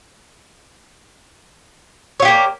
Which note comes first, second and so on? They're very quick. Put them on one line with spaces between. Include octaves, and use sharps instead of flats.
C#5 F4 G4 A#3